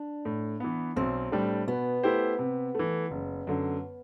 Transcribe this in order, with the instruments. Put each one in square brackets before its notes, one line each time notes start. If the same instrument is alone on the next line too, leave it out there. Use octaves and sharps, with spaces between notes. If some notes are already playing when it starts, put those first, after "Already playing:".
Already playing: [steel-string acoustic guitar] D4
[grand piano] A2
E3 B3
[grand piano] B1 [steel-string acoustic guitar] C4
[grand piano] A2 G3 D4
[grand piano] B2 [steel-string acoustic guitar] B3
[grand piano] A3 E4 G4 C5
C3
E3 A3
F#1
F#2 D3